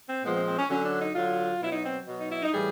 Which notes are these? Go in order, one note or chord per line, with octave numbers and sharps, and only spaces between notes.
C4
A#2 F3 G#3 B3
C4
C4
C#4
D3 F#3 C#4
D4
D#4
D3 F#3 F4
B2 F#3 E4
D#4
C4
B2 F#3
D#4
E4
D#4
A2 E3 G3 G#4